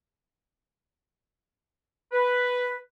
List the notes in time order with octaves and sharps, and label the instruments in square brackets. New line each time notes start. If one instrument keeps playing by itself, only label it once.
[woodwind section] B4